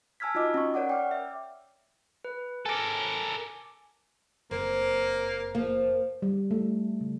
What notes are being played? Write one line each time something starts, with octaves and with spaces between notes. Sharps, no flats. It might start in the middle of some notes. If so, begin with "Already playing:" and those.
G#5 A5 E6 F6 G#6 B6
D#4 F4 F#4 D#5 D6
C#4 C#6
A#4 C#5 D5 F#5 D6
G5 D6 F6
E5
B4
A4 A#4 G#5 D6
F#1 A#3 C4
F3 A#3
G3
A3
C#3